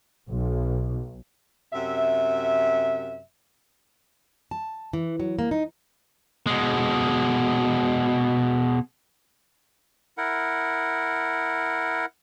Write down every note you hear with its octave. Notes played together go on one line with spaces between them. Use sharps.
B1
F#2 C3 E5
A5
E3
F#3
A#3
D#4
B2 G#3
E4 A#4 F#5